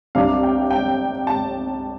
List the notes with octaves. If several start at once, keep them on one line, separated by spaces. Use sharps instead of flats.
C2 C3 G3 D4 F5
G5
G5
A5